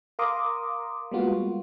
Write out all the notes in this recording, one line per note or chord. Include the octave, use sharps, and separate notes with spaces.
A#4 F5 A#5 C6 D6 D#6
G3 G#3 A#3 B3 F4 F#4